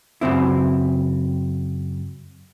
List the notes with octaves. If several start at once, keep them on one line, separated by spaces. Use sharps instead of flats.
F#2 C#3 C4 E4